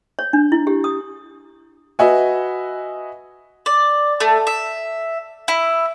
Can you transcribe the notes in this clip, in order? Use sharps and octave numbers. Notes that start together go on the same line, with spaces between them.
C#5
D4
E4
G4
D#6
F#4 B4 D#5 E5 F#5 G#5
D5
A3
E5
E4